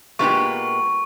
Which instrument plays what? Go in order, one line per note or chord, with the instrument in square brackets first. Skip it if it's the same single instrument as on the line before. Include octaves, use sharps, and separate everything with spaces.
[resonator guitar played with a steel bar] A#2 G#3 B3 D#4 G4 [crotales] C#6